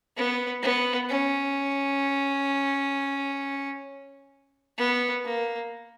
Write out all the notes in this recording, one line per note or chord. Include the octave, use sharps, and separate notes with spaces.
B3
B3
C#4
B3
A#3